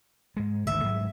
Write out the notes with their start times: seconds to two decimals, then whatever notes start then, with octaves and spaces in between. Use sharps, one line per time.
0.37 G#2 G#3
0.67 G#1 D2 G#2 E5
0.83 G#2 F#3 G#3